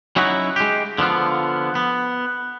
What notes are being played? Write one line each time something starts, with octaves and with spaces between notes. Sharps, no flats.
F#3 C#4 D#4 E4 F#4
G#3 G4
D3 F3 B3 F4
B3